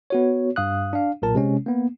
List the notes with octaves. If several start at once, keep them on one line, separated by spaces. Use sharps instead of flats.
B3 F#4 C#5
G2 F5 D#6 F#6
D4 F5
B1 A#2 A#4 A5
C3 G#3 C#4
A#3 B3